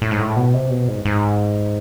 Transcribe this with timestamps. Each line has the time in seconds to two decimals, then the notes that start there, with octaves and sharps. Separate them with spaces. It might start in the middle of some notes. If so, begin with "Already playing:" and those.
0.02 A2
0.11 G#2
0.20 A2
0.36 B2
0.54 C3
0.70 B2
0.88 G#2
1.05 G#2